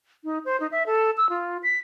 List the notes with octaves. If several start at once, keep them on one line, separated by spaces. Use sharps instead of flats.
D#4
C5
D#4
E5
A4
E6
F4
B6